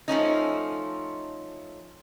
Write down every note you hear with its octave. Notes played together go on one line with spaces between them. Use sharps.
F3 A3 C#4 D#4